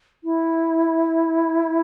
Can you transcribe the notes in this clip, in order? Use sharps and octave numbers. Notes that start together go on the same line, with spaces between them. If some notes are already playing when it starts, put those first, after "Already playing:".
E4